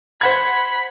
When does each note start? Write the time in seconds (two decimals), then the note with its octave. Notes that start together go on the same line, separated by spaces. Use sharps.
0.21 C5 F#5 B5 G#6